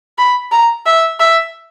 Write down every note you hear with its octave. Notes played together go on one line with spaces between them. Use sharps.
B5
A#5
E5
E5